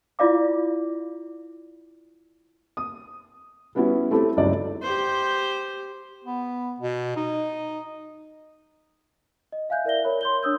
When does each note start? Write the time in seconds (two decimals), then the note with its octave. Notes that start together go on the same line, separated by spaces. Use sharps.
0.19 E4 F4 D5 F5 D6
2.77 D#6
3.75 G3 B3 C#4 E4 F#4
4.11 A3 C4 E4 G4 A4
4.37 G1 C#2 F#3 D#4 E4 D5
4.82 G4 C5
6.24 B3
6.80 B2
7.16 D#4
9.52 D#5
9.69 E5 F5 G#5 F#6 G6
9.85 E4 A#4 D5 E5 A#6 G7
10.04 A#4 C#5 B5 F#6
10.21 C6 G6 G7
10.43 D4 C#5 D#6 E6 G6